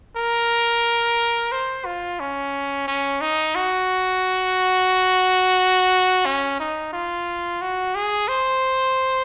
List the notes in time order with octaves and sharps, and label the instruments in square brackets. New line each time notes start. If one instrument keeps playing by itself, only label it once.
[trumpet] A#4
C5
F4
C#4
C#4
D#4
F#4
C#4
D#4
F4
F#4
G#4
C5